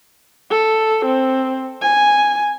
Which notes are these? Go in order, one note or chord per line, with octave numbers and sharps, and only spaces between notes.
A4
C4
G#5